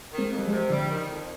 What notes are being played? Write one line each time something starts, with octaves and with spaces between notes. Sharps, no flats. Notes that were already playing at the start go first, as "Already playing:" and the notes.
D#3
G#3 C4
F2
G3
F3 G#3
C3
D3 F3 G3
D#3
F2